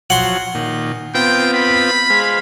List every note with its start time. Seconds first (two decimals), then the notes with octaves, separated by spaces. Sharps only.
0.10 F3 F#3 C#5 F#5 C6
0.55 A#2 D#3
1.14 B3 C4 F4 G5
1.54 B5
2.10 G#3 C5 F5